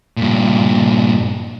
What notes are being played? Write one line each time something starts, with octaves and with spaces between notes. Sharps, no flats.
G2 A#2